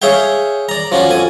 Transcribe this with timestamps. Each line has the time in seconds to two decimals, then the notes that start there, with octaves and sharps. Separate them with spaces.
0.02 G#4 C#5 E5 F5 G5
0.69 D5 A#5
0.92 F3 C#4 F#4 D5
1.11 F2 G#5